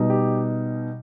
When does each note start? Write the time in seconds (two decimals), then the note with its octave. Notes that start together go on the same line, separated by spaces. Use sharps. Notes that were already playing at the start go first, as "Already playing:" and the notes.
Already playing: B2 G3 D#4
0.10 G4